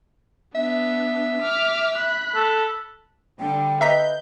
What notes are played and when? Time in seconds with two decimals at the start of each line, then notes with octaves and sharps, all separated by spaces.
0.55 B3 D4 E5
1.42 D6 F6
1.96 B5 F#6
2.35 A4
3.39 D3 G3 G5
3.81 B4 D#5 E5 A#5 G6 B6